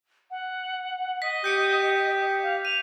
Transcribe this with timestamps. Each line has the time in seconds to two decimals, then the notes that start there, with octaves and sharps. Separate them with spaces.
0.30 F#5
1.22 D#5 B6
1.44 G4 G6 C#7 D7
2.43 F5
2.65 D#7 F7